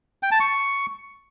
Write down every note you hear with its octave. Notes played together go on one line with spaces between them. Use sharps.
G5
A5
C#6